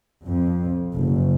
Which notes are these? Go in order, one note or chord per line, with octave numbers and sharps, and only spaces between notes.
F2
F#1